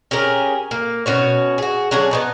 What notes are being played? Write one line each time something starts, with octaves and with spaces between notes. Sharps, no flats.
C#4 G4 G#4 A#4
A#3
B2 C#4 F#4 C#5
F#4 G#4
F#3 C#4 D4 G#4
B3 C4 D#4